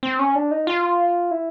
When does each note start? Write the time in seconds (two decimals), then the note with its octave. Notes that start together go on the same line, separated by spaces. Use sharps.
0.03 C4
0.19 C#4
0.36 D4
0.51 D#4
0.67 F4
1.31 E4